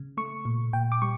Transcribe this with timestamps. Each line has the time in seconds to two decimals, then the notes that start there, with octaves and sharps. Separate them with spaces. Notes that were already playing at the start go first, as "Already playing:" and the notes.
Already playing: C#3
0.17 A3 C#6
0.45 A#2
0.73 A#2 G5
0.92 D6
1.02 G3 C#6